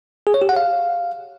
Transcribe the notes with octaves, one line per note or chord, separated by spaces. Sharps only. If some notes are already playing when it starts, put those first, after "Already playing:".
G#4
C#5
G4
F#5
F5